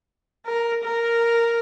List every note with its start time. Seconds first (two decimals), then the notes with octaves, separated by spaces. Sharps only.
0.45 A#4
0.84 A#4